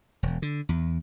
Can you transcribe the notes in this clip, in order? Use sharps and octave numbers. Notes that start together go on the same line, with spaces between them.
E1
D3
E2